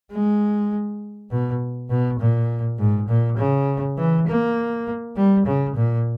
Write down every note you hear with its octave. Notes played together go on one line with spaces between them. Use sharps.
G#3
B2
B2
A#2
G#2
A#2
C#3
E3
A#3
G3
C#3
A#2